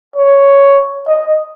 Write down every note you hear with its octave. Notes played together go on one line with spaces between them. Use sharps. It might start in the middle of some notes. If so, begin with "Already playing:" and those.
C#5
D#5